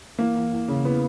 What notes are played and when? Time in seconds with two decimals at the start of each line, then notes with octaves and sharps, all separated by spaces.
0.19 E3 A#3
0.36 E2
0.52 E2
0.68 C#3
0.84 E3 B3